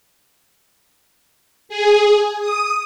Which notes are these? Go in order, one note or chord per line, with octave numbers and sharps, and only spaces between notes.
G#4
D#6